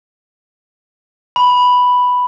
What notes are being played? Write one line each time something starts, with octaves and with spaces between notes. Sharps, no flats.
B5